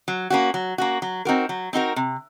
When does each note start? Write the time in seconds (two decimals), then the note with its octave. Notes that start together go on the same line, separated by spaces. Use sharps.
0.08 F#3
0.30 A#3 C#4 F#4
0.54 F#3
0.78 A#3 C#4 F#4
1.02 F#3
1.25 C4 D#4 F#4 A#4
1.49 F#3
1.73 C4 D#4 F#4 A#4
1.96 C3